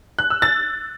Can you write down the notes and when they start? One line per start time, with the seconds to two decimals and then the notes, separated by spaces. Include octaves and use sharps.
0.19 F#6
0.30 E6
0.42 A6